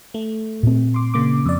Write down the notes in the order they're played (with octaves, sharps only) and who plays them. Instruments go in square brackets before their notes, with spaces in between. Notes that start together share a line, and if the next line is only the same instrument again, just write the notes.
[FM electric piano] A3
[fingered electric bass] A#2 C4
[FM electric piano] C6 D6
C#3 A#3 D6
F2 D5